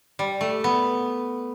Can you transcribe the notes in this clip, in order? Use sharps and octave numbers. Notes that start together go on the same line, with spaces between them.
G3
A3
B3